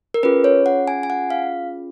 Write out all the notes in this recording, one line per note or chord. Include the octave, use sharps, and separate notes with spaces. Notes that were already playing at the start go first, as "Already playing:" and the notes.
A#4
C#4 F4 G#4 B4
C#5
F#5
G#5
G#5
F#5
F5